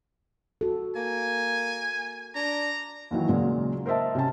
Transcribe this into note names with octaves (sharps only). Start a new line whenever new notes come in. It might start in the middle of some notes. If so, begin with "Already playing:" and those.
F#4 A4
A#3 G#5
D4 A#5
D#2 D#3 E3 F#3
A#2 C#3 F#3 G#3 A#3
A#4 C5 D#5 E5 A5
C3 C#4 A5